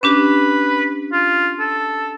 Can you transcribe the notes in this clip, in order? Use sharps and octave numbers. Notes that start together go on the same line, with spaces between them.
C#4 D4 G4 B4
F4
A4